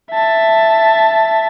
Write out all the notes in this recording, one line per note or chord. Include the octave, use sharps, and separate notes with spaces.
E5 A5